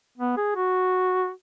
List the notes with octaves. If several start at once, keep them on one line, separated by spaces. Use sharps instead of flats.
B3
G#4
F#4